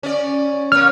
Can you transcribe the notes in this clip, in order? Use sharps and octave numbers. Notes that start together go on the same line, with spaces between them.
C#4 D5
A#3 C#5 F6